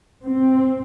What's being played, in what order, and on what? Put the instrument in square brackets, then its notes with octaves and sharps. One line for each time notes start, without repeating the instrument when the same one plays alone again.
[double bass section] C4